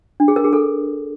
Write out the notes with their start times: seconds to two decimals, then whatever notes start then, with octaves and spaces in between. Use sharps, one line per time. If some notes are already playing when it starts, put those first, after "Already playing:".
0.20 D4
0.28 G#4
0.36 A#4
0.44 G#4
0.53 A4